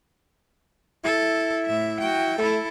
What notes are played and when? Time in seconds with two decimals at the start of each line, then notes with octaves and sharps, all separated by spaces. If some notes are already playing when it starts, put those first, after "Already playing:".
1.04 E4 A4
1.66 A2 E5
2.00 F#4 G5
2.38 A3 E4 A4